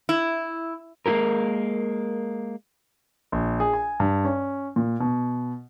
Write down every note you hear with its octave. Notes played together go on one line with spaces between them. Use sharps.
E4
G#3 A#3 E4 G4 A#4
A#1
G#4
G#5
G2
C#4
A#2
B2